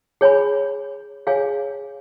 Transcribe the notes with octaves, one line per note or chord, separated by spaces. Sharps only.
G#4 C#5 G#5 B5
G#4 C#5 F5 G#5